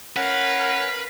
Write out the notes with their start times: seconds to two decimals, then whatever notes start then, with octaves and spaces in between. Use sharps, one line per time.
0.16 C#4 A#4 B4 F5 F#5